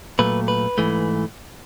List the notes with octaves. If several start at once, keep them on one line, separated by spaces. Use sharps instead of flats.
A#2 F#3 A3 B4
B4
G#2 E3 A3